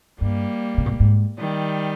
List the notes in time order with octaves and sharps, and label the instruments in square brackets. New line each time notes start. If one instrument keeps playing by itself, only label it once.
[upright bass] G2 [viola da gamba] G3 A#3
[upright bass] C#3
B2
A#2
G#2
[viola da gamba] D#3 G3